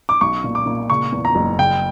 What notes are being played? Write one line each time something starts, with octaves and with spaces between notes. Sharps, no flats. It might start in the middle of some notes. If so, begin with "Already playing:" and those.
D6
B1 C#6
A#2
D6
A#2
C#3 C#6
E2
A#5
F#1
C#3 G5